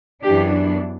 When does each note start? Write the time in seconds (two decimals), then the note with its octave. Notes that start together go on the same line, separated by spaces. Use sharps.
0.23 F#2 E3 B3 D4 G4